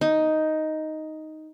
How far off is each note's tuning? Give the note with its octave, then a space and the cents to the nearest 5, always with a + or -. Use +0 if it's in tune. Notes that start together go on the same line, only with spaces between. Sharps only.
D#4 +5